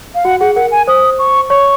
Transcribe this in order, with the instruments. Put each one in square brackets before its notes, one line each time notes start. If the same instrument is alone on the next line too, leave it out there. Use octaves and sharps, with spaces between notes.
[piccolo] F5
[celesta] F#4 [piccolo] F#5
[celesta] G#4 [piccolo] F#5
[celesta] A#4 [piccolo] F#5
[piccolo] G#5
[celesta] C5 [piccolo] D#6
[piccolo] C#6
[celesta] C#5 [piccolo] C#6